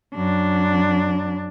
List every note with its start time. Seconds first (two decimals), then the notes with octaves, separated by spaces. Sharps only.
0.15 F#2 D4